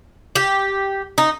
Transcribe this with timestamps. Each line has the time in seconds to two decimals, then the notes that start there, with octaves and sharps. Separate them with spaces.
0.35 G4
1.18 D#4